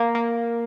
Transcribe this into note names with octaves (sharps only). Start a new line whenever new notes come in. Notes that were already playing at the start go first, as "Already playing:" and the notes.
Already playing: A#3
A#3